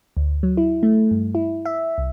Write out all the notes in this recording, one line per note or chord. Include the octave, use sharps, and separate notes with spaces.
D2
F#3
E4
A3
G2
E4
E5
C2